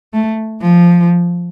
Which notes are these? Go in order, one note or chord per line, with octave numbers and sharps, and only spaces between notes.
A3
F3